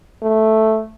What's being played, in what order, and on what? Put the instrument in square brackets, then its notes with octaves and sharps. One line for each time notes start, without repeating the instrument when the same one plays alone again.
[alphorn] A3